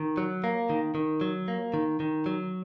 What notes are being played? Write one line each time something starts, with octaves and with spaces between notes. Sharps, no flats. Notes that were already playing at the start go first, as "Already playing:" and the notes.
Already playing: D#3
F#3
A#3
D#3
D#3
F#3
A#3
D#3
D#3
F#3